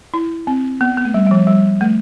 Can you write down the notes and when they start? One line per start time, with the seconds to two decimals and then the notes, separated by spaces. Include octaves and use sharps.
0.14 E4
0.47 C4
0.81 B3
0.98 B3
1.05 A3
1.14 G3
1.26 G3
1.31 F3
1.47 G3
1.81 A3